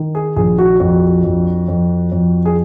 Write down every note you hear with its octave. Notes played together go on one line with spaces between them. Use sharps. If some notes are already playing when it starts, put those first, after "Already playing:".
Already playing: D#3
G#4
A#1 G#4
F#4
F2 F#4
F2
F2
F2
G#4